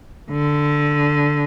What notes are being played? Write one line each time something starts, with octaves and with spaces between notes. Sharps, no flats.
D3